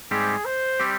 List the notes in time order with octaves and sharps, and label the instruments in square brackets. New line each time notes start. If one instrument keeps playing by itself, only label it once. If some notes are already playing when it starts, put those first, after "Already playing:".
[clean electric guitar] G#2 G3 C4 G4 [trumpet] G#4
[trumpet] C5
[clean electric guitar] G3 C4 G4